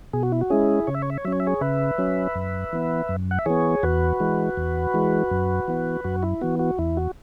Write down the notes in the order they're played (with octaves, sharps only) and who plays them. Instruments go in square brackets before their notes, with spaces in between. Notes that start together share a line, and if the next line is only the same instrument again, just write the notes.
[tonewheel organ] B2 G#4
F#4
E4
F#4
G#3 C#4 E4 G#4
C#3 C#5
E5
C#5
E5
C#5
F#3 E5
C#4 C#5
E5
G#4 C#5
C#3 B4 E5
F#3 C#4
F#2
E3 B3
F#2
F#5
E5
E3 B3 G#4 C#5
E2 F#4 B4
E3 G#3
E2
E3 G#3
F#2
E3 B3
F#2 F#4
E4
E3 B3 F#4
F#4
E2 E4
F#4